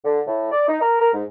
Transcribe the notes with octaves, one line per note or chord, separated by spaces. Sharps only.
D3
A2
D5
D#4
A#4
A#4
G#2